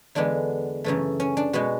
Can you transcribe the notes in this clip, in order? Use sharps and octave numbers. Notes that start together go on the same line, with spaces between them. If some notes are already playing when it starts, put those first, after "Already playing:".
E2 D3 G#3 B3 D4
F#2 C#3 E3 A3
C#4
D4
B2 G#3 B3 F#4